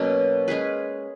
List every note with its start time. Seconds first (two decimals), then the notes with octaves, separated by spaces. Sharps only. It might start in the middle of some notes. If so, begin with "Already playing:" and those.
Already playing: B2 F#3 A#3 C#4
0.48 G#3 C#4 G#4 B4